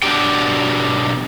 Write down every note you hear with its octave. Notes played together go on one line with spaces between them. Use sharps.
B2 F#3 D4 G4 G5